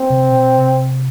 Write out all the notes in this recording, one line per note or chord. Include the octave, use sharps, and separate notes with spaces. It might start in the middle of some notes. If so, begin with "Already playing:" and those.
Already playing: C4
C3
B2
C3